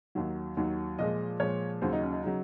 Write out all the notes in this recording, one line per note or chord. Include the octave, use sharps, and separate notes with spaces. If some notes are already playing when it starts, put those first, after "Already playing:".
D#2 D#3 F#3
D#2 D#3 F#3
A#2 F3 G#3 D#5
A#2 F3 G#3 C#5
D#2 C#3 F#3 C5
D#4
C#4
D#4
C#3 F#3 D#4